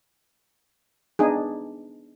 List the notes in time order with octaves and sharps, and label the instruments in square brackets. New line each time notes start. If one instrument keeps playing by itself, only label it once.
[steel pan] B3 D4 D#4 G#4